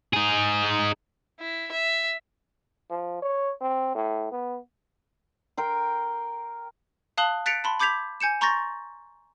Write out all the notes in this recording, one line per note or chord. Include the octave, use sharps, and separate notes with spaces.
D#4 G#4
E4
E5
F3
C#5
C4
A2
B3
A#4 G5 C6
F5 A5 D#6 F#6 F#7 G7
F#6 A6 B6 C#7 D7 F7
A5 B5 C6
B5 D6 G6 G#6 B6 F7
G#5 G6 C#7 E7
A#5 C6 C#6 G6 A6 A#6